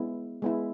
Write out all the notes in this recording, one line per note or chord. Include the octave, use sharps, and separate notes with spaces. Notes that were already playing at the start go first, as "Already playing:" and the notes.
Already playing: G#3 B3 E4
G#3 B3 E4